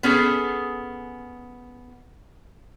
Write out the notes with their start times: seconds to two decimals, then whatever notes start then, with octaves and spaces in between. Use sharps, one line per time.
0.03 B3 C#4 G#4 A4